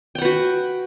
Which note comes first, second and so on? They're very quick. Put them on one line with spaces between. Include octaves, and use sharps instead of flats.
G5 F#5 B4 F#4